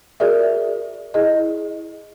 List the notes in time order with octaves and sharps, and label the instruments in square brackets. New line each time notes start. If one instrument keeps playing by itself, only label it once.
[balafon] F#4 G#4 A#4 D5 E5
E4 G#4 D#5